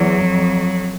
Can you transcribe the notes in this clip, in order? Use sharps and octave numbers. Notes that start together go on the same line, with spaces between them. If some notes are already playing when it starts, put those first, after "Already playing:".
Already playing: E2 F#3
F2